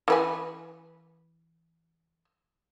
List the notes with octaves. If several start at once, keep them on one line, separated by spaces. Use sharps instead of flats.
E3 B4 G#5